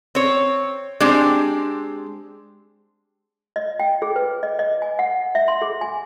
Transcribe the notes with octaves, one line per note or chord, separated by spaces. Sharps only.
C4 C#5
G#3 C4 D4 G4
D#5
G5
G#4
B4
D#5
D#5
G#5
F#5
E5
C6
G#4
G#5